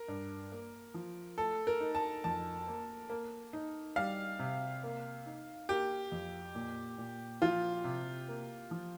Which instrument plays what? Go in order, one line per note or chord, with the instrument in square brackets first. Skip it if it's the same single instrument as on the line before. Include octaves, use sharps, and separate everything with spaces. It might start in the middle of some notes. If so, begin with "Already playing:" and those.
Already playing: [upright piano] A#4
[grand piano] G2
A#3
F3
[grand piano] A3 [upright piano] A4
[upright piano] A#4
[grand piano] D#4
[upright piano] A5
[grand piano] F2 [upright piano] A5
[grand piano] A#3
A#3
D#4
[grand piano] G3 [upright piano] F5
[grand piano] C3
A#3
D#4
[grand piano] A#3 [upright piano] G4
[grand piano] F2
A#2
A#2
[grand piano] F3 [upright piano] F4
[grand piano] C3
A#3
F3